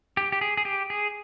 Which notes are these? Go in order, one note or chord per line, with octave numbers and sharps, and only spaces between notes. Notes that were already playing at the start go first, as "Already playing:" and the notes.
G4
G4
G#4
G#4
G4
G#4